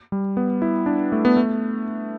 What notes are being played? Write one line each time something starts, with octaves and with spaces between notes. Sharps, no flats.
G3
B3
E4
D4
A3
B3
A3